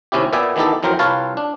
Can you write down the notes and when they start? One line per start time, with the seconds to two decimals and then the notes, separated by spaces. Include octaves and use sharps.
0.12 D#2 C3 C#4 E4 G4
0.33 A#2 B3 D5 E5 G5 G#5
0.56 D#3 E3 B3 D#4 G4 A4
0.83 F2 E3 F#3 A#4 C5 G5
0.99 C2 F4 B4 C#5 F5 A5
1.37 D4